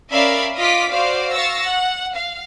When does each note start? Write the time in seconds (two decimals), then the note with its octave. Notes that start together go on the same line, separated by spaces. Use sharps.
0.12 C#4 A#4 D5 E5 F5 B5
0.57 F4 D#5 F5 D6 B6
0.89 F#4 C5 D5 F5
1.32 F5 C#6 E6 A6 A#6
1.64 F#5
2.13 F5